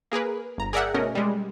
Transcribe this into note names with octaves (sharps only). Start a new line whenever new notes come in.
A#3 G#4 A#4 B4
G1 A#5
G#4 A#4 D5 E5 F#5 G5
B2 A3 C#4 A#4 D#5
G3 G#3